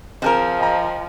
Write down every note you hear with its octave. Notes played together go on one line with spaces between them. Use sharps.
F3 C4 G#4 A#4
D#5 G5 A#5